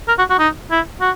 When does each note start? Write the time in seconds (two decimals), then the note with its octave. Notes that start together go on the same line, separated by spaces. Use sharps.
0.08 A#4
0.18 F#4
0.30 F#4
0.39 D#4
0.71 E4
1.01 F#4